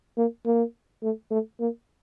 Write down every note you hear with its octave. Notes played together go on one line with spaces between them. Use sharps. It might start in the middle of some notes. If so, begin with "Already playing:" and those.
A#3
A#3
A3
A3
A#3